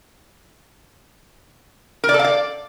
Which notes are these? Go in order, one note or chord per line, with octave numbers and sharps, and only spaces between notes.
A#4
D5
A4
F5
D5